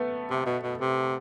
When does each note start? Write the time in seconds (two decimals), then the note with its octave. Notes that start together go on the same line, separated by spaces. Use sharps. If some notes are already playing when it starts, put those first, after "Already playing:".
Already playing: A3 B3
0.30 C3
0.46 B2
0.63 B2
0.80 C3